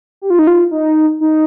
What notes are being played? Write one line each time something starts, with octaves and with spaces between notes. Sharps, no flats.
G4
F4
D#4
F4
D#4
D#4